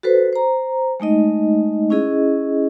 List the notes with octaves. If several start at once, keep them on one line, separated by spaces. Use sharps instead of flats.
F#4 A4 B4 C5
C5 A#5
G#3 A3 D#4 D#5
C#4 E4 G#4 D#5